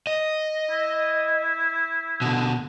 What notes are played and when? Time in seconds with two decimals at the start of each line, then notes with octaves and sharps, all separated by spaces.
0.07 D#5
0.70 E4
2.21 B2 D3